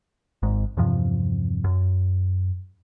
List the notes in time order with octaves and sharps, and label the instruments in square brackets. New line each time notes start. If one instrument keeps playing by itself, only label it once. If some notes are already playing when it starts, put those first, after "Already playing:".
[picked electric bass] G#1 G#2
E2 G2 C3 F3
F#2